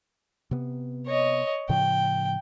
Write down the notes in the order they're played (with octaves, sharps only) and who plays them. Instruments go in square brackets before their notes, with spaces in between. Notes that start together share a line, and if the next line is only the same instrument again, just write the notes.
[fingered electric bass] C3 B3
[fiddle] C#5 D#5
[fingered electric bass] A2 C#3 F3 [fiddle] G5